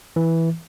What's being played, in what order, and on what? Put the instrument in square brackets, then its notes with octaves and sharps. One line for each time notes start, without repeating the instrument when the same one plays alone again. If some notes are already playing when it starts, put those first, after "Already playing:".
[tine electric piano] E3